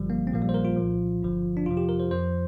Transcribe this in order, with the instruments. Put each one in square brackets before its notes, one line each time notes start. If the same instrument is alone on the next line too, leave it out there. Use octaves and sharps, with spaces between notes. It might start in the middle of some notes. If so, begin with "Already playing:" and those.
Already playing: [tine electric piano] G1 G2 D3 F3 G3
A#3
C4
A#1 A#2 F3 A#3
G3
C5
A#4
F4
C2 A#2 F3
G1 G2 D3 F3
D4
F2 C3 F3 F4
G4
A#4
C5
F2 F3 C5